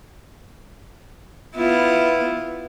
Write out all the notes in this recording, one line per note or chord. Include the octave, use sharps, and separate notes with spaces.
B3 E4 F4